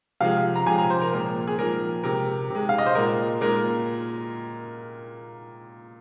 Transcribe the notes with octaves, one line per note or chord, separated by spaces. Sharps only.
C3 F3 G#3 F5
A#5
C3 F3 G#3 G#5
A#5
C5
A#4
A#2 F3 G#3 A#4
G#4
A#2 F3 G#3 A#4
C3 G#3 A#4
C3 G#3
F5
D#5
C5
A#2 G#3 A#4
A#2 G#3 A#4